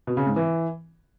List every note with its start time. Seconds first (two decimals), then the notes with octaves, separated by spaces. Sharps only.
0.07 B2
0.17 C#3
0.27 G#2
0.36 E3